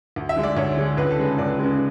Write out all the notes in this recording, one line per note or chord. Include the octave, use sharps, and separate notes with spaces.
D2
E5
D3 G#3
D5
D2 C#5
D3 G#3
C#2 B4
A4
C#3 G#3
C#2 D5
C#3 G#3